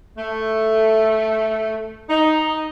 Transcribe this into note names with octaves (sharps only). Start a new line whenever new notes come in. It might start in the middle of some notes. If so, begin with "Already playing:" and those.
A3
D#4